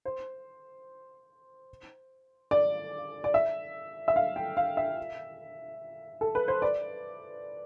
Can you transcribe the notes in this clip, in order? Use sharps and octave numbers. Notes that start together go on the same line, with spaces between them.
C5
D5
D5
E5
E5
F5
G5
F5
E5
A4
B4
C5
D5